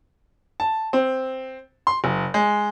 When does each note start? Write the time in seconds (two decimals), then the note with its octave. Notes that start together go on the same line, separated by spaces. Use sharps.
0.60 A5
0.93 C4
1.87 C6
2.04 F#1
2.34 G#3